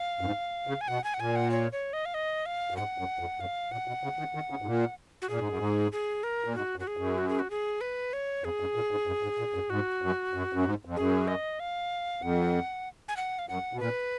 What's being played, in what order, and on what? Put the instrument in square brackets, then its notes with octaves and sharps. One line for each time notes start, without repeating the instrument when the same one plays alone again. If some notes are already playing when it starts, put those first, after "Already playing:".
Already playing: [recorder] F5
[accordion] F#2
G#2
C#3
[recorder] G#5
[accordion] B2 [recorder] F#5
[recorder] G#5
F#5
[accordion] A#2 [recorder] G#5
[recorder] F#5
C#5
C#5
D#5
F5
D#5
F5
[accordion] F#2
[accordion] G#2 [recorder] F#5
[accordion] F#2
F2
[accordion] F#2 [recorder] F5
[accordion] A#2 [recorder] F#5
[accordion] B2
C#3
D#3
D#3
C#3
G#2
A#2
[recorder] F#4
[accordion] A#2 [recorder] G#4
[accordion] G#2
F#2
G#2
[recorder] G#4
A#4
[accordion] A#2
[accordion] G#2 [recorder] F#4
[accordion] F#2
[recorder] F#4
G#4
[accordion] F#2
[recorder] F#4
G#4
F#4
G#4
B4
C#5
[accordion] F2 [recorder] G#4
[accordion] F#2
A#2
G#2
F#2
G#2
A#2
F#2
[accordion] G#2 [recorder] F#4
[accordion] F#2
F#2
F#2
G#2
F2
[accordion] F#2 [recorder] G#4
[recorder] D#5
F5
[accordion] F2 [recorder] F#5
[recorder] G#5
F#5
F5
[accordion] F#2 [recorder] F#5
[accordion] B2
[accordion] A#2 [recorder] B4